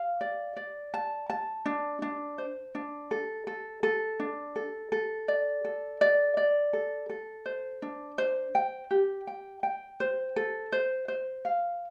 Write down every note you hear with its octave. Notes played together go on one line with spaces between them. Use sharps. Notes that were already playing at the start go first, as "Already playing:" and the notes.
Already playing: F5
D5
D5
A5
A5
D4
D4
C5
D4
A4
A4
A4
D4
A4
A4
D5
A4
D5
D5
A4
A4
C5
D4
C5
G5
G4
G5
G5
C5
A4
C5
C5
F5